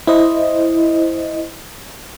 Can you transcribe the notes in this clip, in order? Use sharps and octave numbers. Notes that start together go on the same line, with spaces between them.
E4 C5 D#5